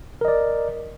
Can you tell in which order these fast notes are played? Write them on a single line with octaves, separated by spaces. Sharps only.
A#4 D#5 D5